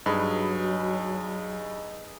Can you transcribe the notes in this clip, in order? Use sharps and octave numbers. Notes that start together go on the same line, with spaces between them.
G2 F#3 D#4 G#4 B4